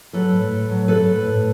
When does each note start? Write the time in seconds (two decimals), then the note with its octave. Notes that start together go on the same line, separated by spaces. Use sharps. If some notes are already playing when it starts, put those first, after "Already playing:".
0.13 F#3 A4 B4
0.32 A2
0.51 A2
0.70 F#3
0.88 F#3 A4 B4
1.06 A2
1.25 A2